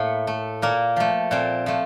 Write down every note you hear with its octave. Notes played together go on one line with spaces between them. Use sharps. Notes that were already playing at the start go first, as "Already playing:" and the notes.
Already playing: A2 A3 A#3
A3
A#2 A#3
F3 A3
A#2 C4
F3 A3